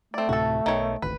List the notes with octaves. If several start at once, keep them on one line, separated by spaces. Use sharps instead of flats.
A3 C4 D5
D2 A2 C3 F#4 A4
B1 D#3 C#5
D1 G#1 D2 B4